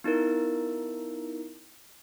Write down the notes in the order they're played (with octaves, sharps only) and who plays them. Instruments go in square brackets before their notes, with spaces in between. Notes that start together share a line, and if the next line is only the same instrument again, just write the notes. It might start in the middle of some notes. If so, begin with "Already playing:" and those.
[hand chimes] B3 D#4 E4 A#4